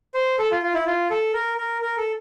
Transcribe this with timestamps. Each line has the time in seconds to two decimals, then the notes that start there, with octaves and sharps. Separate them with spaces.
0.14 C5
0.39 A4
0.51 F4
0.62 F4
0.74 E4
0.86 F4
1.10 A4
1.34 A#4
1.58 A#4
1.82 A#4
1.98 A4